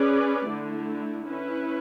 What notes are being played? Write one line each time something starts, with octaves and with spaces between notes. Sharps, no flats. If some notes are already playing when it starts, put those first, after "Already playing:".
Already playing: C#4 G#4 B4 D5
D3 A3 E4
C#4 E4 B4